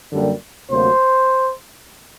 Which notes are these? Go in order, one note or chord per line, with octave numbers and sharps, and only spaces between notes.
F#2 D3 G3 A#3
D2 C3 F#3 A#3 C5